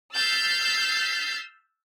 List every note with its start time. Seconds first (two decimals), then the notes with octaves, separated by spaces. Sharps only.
0.16 E6 F6 G6 A6 B6 C7